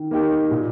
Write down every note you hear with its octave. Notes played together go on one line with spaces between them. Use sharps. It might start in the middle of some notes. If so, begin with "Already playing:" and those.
Already playing: D#3
A#3 D#4 G4 A#4
A#2